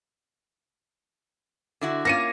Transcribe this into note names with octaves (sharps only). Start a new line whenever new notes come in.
D3 E4 F#4
A#3 C#4 F4 A#6 C#7 D#7